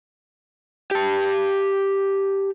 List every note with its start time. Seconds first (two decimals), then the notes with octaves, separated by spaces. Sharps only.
0.91 G4 A5